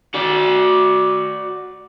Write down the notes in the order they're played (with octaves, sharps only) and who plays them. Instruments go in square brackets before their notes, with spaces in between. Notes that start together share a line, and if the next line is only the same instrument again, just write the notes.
[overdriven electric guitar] F#4 D5